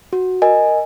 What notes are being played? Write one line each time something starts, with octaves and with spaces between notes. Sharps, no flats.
F#4
A#4 D#5 G#5